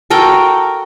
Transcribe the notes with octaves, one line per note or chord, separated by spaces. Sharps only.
F#4 A4 A#4 G5